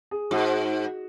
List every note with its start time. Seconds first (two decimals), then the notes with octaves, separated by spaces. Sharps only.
0.11 G#4
0.31 G#2 F#4